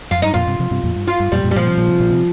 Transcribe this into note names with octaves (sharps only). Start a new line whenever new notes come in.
F2 F4
G2 D#4
F2 A#2 F4
G2 C3
C3 F3
G2 C3
F2 A#2
G2
F4
G2
F2 A#2 G3
F2 A#2
G3
A#2 F3
C3
A#2
C3
A#2
C3